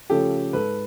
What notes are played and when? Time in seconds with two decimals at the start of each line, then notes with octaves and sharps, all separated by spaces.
0.09 C#3 F3 A3 C#4 G4 A4
0.53 G#2 A4 B4